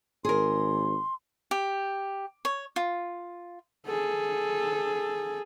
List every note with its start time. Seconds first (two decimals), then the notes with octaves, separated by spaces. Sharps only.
0.25 G#1 G#4 A#4 C6
1.51 G4
2.45 C#5
2.76 F4
3.86 G#4 A4